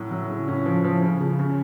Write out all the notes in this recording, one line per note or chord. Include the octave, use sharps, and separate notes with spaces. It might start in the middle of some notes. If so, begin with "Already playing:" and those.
Already playing: A2 F#3 C#4
F#3
C#3
A2 C#4
F3
F3
C#3
C#3
C#3